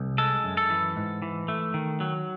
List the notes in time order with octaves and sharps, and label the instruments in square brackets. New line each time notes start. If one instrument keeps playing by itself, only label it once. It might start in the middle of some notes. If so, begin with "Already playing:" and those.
Already playing: [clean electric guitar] C2
G#3 A4
F#2
A4
E3
G#2
E3
A3
D#3
F#3